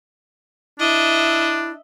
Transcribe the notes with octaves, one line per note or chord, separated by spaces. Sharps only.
D4 E4 D#5 E5